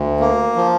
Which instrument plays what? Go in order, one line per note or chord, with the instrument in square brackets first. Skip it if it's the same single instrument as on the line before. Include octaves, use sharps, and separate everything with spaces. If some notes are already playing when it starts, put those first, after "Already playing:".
Already playing: [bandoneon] D2
A#3
F3